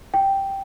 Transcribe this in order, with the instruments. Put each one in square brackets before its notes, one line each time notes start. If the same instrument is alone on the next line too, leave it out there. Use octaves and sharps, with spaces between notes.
[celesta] G5